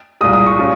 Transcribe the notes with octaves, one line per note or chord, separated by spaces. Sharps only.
C2 A#2 G#3 D#6
D#6
C#6
A#2 G#3 C#4 F4